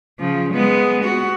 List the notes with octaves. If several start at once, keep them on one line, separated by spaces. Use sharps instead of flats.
C#3 F3
G#3 B3
F#4